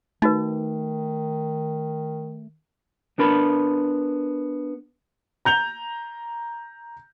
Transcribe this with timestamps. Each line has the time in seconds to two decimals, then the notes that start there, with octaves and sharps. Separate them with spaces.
0.22 D#3 A3 D#4 F#4 B4
3.18 B3 D4 A#4 B5
5.45 A#5 G6 F7 G7